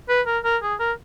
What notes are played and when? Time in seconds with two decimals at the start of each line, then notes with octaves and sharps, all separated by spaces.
0.09 B4
0.26 A#4
0.45 A#4
0.62 G#4
0.80 A#4